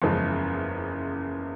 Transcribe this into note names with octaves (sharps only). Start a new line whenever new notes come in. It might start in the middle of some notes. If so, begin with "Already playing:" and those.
F#1 E2 C#3 F3 G#3